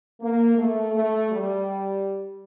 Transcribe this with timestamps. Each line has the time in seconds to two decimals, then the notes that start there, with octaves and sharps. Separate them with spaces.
0.21 A#3
0.58 A3
0.94 A3
1.31 G3